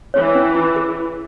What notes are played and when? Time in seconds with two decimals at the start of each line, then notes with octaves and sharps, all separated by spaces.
0.14 E3 C#5
0.35 C#4
0.55 E4
0.76 G#4